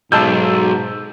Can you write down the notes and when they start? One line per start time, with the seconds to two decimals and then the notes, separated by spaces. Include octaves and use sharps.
0.12 B1 G#2 A5 E6 G6